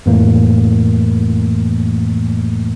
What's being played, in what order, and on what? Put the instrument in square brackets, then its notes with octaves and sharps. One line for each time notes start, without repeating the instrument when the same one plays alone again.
[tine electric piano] F2 A2 E3 A3 A#3